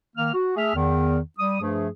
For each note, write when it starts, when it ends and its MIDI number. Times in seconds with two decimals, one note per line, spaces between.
0.16 0.33 51
0.16 0.33 58
0.16 0.33 89
0.34 0.54 66
0.56 0.73 57
0.56 0.73 68
0.56 0.73 76
0.56 0.73 89
0.75 1.19 40
0.75 1.19 51
1.38 1.59 55
1.38 1.59 87
1.61 1.88 43
1.61 1.88 53
1.61 1.88 57
1.61 1.88 68